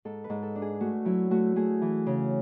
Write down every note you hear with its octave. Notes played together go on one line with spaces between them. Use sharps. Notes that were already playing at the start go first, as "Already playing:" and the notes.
G#2 A4
B4
G#2
A4
D4
G#4
A3 F#4
F#3 E4
A3 F#4
A3 G#4
E3
C#3